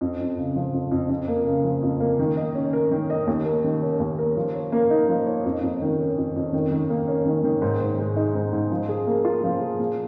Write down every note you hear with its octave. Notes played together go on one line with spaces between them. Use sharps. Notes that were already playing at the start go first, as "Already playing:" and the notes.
F2
F2
C#3
F3
F2
F2
F2
A#3
C#3
F3
F2
A#3
D#3
D#5
C#4
A#4
D#3
D#5
D#2
A#4
D#3
C#4
D#2
A#4
F3
C#5
A#3
D#4
F3
C#5
F2
F2
D#3
C#4
F2
F2
D#3
D#3
A#3
C#4
D#3
D#3
G#2
G#2
G#3
D#4
G#2
G#2
F3
G#4
A#3
F4
F3
G#4
A#2